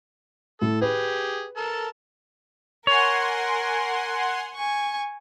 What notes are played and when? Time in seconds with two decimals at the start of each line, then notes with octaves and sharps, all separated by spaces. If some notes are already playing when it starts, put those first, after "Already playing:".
0.62 A2 A4
0.82 G4 G#4 B4
1.57 A4 A#4 A5
2.87 A#4 C#5 F#5 G#5 C6
4.55 G#5 C#6